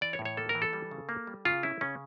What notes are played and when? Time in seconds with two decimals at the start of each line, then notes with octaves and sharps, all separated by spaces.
0.01 E3 D5
0.13 C#5
0.19 A2
0.25 C#5
0.37 A#3 A4
0.49 A#4
0.55 E3
0.62 A4
0.73 G3
0.91 C#3
1.09 A#3
1.27 G3
1.45 C#3 F4
1.63 C#4 E4
1.81 C#3 C#4